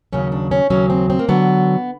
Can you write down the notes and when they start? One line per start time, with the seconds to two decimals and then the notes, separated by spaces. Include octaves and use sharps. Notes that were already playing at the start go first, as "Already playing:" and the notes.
0.13 D#2 C#3 F#3 C#4
0.32 D4
0.51 C#4
0.70 D#2 C#3 F#3 C#4
0.90 C4
1.10 C4
1.19 A#3
1.29 D3 F#3 B3